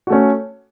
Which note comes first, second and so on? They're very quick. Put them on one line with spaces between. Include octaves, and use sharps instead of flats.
F#4 A3 C#4